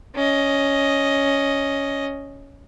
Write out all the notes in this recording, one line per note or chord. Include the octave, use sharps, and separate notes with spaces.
C#4 D#5